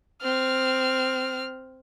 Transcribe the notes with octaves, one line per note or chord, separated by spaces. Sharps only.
C4 F6